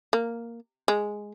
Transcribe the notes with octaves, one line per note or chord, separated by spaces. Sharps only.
A#3
G#3